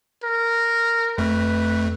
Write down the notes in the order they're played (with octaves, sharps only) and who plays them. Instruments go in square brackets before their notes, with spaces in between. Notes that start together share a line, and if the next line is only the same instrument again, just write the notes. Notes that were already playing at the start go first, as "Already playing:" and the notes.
[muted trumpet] A#4
[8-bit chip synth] F2 A3 [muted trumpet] B4